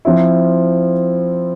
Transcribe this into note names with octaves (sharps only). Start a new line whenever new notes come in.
F3 C4 E4